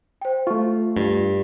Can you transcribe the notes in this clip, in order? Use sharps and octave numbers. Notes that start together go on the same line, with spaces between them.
C5 G5
A3 F4 C#6
G2